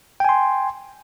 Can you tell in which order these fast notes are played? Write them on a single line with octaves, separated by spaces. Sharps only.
G5 G#5 C6